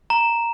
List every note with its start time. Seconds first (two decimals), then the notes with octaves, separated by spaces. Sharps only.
0.10 A#5